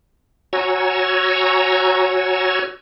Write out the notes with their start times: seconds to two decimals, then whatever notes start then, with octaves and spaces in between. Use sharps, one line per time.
0.53 F#4 C#5 G#5 A#5 E6